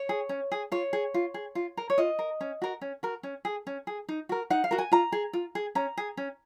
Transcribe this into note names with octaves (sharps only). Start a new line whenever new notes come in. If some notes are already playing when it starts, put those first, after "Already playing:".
Already playing: C#5
G#4
C#4
G#4
F4 C#5
G#4
F4
G#4
F4
A#4
C#5
F4 D#5
A#4
C#4
F#4 A#4
C#4
F#4 A#4
C#4
G#4
C#4
G#4
D#4
F#4 A#4
D#4 F#5
F5
F#4 A#4
G#5
F4 A#5
G#4
F4
G#4
C#4 A#5
G#4
C#4